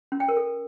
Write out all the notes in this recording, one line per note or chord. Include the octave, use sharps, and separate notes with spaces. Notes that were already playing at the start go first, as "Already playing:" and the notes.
C#4
G5
A#4
A4